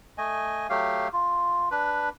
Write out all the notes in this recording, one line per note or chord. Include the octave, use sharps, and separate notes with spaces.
A3 D#5 G#5
F#3 A3 G4 F5
F4
D4 B4